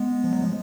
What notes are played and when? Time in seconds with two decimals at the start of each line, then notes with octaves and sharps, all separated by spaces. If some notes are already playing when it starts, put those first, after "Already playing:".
Already playing: G#3 B3
0.24 F3
0.33 F#3
0.42 F3 G#3